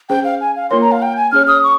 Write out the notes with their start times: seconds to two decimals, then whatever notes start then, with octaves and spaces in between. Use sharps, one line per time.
0.09 C#4 G#4 C5 G5
0.24 F5
0.41 G#5
0.56 F5
0.71 A#3 F4 A#4 C#5 C6
0.82 A#5
0.92 F5
1.02 G5
1.17 G#5
1.32 C#4 G#4 C#5 F6
1.48 D#6
1.63 C#6